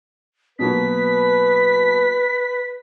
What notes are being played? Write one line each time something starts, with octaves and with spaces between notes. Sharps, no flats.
B2 F#3 A#3 B4 B6